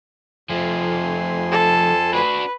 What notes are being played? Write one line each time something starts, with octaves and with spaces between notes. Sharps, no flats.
F2 F3 A3 G#5 C6
A4
D4 F#4 B4